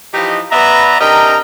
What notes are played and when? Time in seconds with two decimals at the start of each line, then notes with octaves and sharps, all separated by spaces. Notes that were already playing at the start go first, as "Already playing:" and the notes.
0.13 E3 F3 D#4 G4 D#5
0.52 B3 B4 D5 E5 A#5
1.00 C3 D4 A#4 D#5 G5 A#5